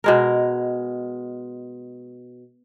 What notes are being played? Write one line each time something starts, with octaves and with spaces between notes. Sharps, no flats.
B2 G#3 A#4